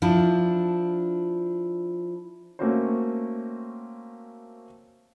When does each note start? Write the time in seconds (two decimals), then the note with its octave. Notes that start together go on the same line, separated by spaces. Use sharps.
0.02 F3 D4 E4
2.59 A3 A#3 C4 C#4 F#4 C5